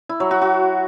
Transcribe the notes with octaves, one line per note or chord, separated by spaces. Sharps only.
E4
F#3
F#4
F#4